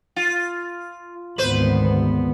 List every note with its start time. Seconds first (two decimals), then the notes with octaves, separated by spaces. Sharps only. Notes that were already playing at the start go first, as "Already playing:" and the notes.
0.16 F4
1.38 G#1 D2 B3 B4 C5